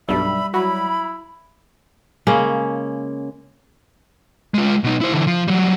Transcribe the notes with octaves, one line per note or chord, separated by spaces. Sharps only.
B1 G2 G3 E5 B5
F#3 E4 B5
C#3 G#3 A#3 C#4
G#3 F4
B2 D#4
E4 C5
D3 E3
F3
F#3 G3